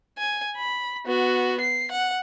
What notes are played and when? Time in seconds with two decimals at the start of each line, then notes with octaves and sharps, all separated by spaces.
0.18 G#5
0.57 B5
1.06 B3 F#4
1.61 C7
1.92 F#5